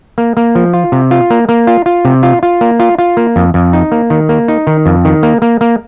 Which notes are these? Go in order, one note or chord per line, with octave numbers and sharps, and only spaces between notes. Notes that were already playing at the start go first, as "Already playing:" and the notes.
A#3
A#3
F3
F4
C3
F4
A#3
A#3
F4
F4
C3
F4
F4
A#3
F4
F4
A#3
F2
F2
D#4
A#3
D#3
A#3
D#4
D#3
F2
D#3
A#3
A#3
A#3